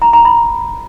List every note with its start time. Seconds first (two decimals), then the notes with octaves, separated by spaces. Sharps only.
0.02 A#5
0.13 A#5
0.25 B5